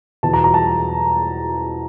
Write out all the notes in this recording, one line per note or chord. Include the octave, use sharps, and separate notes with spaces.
E2 B2 A5
A#5
A#5
A5